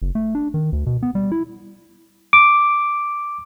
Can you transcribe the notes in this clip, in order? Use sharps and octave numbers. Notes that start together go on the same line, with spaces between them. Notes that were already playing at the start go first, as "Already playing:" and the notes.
F#1
A3
D4
D#3
D2
B2
B3
G3
E4
D6